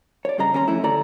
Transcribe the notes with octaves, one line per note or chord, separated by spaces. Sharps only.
C#5 D5
G2 C#3 G#4 D#5 A#5
D#2 C#4 A4 A#5 C6
F2 A3 C#4 E4
D2 A4 D5 A#5